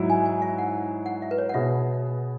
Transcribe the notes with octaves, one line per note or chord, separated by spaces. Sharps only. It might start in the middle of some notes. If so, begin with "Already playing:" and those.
Already playing: G#2 F#3 E4
G#5
G#5
E5
F#5
F#5
E5
B4
C#5
F#5
B2 B3 G#4 E5